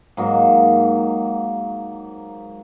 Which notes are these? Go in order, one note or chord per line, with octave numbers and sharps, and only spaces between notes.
G#2 F#3 A#3 D#4